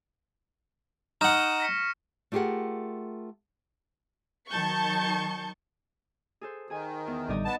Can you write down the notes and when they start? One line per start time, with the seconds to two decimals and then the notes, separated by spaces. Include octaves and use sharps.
1.21 D#4 F#5 C#6 F6 E7
1.60 A#6 B6 C#7
2.32 A3 F4 G4 G#4 A#4 F#5
4.49 D#3 F#3 A5 C#6 G6 C#7
6.41 G#4 A4 C5
6.70 D#3 G#4 G#5
7.07 E2
7.28 A1 D3 G3 D#4 D5 D#5
7.45 B3 A5